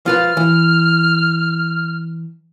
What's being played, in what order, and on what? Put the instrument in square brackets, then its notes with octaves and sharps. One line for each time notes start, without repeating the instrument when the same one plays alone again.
[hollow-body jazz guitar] F3 F4 B4 [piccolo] F6
[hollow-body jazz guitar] E3